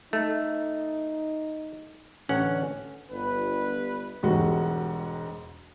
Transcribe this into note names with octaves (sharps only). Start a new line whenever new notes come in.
A3 D#4
A1 D3 C#4 F#5
G1 B4
E1 G#2 G3 F#4